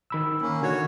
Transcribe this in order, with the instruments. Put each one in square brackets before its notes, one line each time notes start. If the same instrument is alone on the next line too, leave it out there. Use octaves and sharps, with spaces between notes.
[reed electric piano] D#3 B5 E6
[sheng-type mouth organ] A#3 C#4
[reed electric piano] D3 D#3 G#6 [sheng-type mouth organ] F#4 C#5